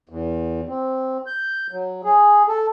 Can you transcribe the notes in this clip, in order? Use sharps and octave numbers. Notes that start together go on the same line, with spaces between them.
E2
C4
G6
F#3
G#4
A4